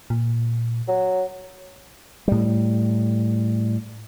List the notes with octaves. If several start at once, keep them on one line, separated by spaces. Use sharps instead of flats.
A#2
F#3
A2 G3